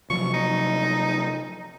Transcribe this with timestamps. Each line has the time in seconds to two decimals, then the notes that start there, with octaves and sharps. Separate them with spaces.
0.10 C3 F3 F#3 C#6
0.34 D#4